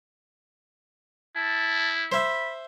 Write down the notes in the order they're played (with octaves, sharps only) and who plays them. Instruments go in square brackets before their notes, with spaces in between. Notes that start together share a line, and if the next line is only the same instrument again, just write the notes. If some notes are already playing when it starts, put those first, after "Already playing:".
[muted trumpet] E4 [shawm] A5
[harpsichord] C5 E5 [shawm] B5